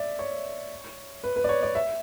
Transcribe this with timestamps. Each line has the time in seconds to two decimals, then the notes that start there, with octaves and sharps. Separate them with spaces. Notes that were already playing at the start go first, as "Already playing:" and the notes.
Already playing: D5 E5
0.19 C#5
1.24 B4
1.36 B4
1.44 D5
1.49 C#5
1.63 D5
1.75 E5